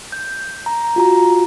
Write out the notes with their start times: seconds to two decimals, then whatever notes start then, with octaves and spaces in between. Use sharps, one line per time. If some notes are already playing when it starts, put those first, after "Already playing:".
0.12 G6
0.66 A#5
0.96 F4 F#4 A#5